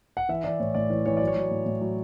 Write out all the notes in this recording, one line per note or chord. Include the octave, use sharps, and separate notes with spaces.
F#5
E3 E5
E3 D5
A2 C#5
A2 D5
E3 C#5
E3 C#5
F#3 D5
C#5
F#3
A2
A2
F#3